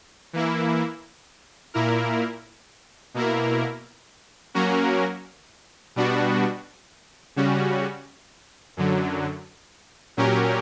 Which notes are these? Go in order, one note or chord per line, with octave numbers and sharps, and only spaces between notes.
E3 A#3 E4
A#2 A#3 E4 A#4
B2 A#3 E4 A#4
F#3 A#3 C#4 F#4 A#4
B2 G3 B3 D4 F#4
C#3 G3 C#4 F#4
F#2 D3 F#3
A#2 F#3 C#4 G4 A#4